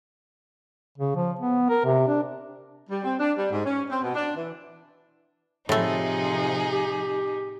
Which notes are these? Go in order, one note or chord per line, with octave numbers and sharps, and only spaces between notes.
C#3
F3
B3
A#4
C3
D4
G3
C4
D4
G3
G#2
C#4
C4
B2
D4
E3
A2 C3 F3 A3 D#4 G#4
G4